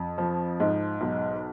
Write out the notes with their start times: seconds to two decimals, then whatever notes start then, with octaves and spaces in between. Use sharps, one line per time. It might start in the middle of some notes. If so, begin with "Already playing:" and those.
Already playing: F2
0.18 F3
0.60 G#2
1.01 B1